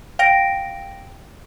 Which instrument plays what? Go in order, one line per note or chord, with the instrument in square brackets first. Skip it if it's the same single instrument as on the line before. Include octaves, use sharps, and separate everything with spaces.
[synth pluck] F5 G5 A#6 D7